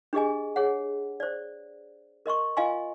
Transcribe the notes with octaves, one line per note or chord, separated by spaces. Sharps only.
D4 G4 G#4 D#5 G#5
G#4 C#5 F#5
C5 D5
A#4 D#5 C6 C#6
F4 D#5 F5 G#5 C6